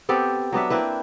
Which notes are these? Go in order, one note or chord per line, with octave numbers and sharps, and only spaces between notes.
B3 C4 G4 A4
F#3 B3 D4 E5
A#3 C4 E4 B4